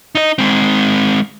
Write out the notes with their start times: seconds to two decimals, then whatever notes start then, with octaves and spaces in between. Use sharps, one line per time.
0.15 D#4 D#5
0.38 G#3 C4